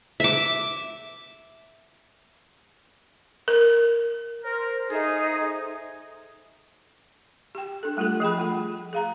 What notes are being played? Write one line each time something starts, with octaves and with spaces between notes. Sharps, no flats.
E5 D6
A#4
A#4 C5
D#4 G#4 A4 E5
G4 G5
D4 A4
G3 A3 F4 G4 A4
F3 G#4 G5 B5
A3 F4
G#4 F5 A#5